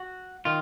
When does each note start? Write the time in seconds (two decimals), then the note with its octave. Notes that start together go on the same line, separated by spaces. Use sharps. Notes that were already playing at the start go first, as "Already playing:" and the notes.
Already playing: F#4
0.45 D#3 F4